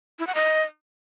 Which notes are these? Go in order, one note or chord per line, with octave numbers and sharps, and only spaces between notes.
E4
F#5
D#5